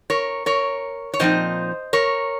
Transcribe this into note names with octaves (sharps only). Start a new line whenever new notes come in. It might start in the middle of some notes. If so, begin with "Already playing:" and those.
A#4 C#5
A#4 C#5
C#5
A#2 F3 C4 D#4 C5 D#5
A#4 C#5